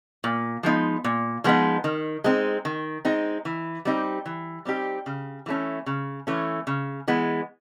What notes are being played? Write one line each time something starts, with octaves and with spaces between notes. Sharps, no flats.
A#2
F3 G#3 B3 D#4
A#2
F3 G#3 B3 D#4
D#3
G#3 C4 D#4
D#3
G#3 C4 D#4
E3
G3 C4 D#4 G4
E3
G3 C4 D#4 G4
C#3
E3 A3 C#4
C#3
E3 A3 C#4
C#3
E3 G#3 B3